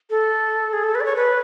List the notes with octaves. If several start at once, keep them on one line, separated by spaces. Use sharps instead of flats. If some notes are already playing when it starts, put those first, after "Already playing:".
A4
G#4
A4
B4
D5
C#5
B4